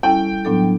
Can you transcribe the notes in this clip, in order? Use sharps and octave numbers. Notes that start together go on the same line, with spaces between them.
G3 C#4 E4 A4 G5
A2 F#3 B3 D4 A4